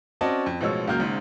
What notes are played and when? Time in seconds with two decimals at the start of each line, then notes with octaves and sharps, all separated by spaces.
0.21 C4 C#4 F#4 D5 D#5 A5
0.46 F2
0.61 A1 B2 F3 G#3 C#5 E6
0.87 C#2 C#3 F#3 A#3 F6 G6
1.00 G#1 G#2 C#3